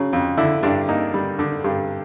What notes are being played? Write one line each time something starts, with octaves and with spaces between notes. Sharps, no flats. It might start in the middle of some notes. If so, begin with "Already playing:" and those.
Already playing: C#3 F#3
F2
D3 E4
G2 D4
A#3 D#4
G3
D3
G2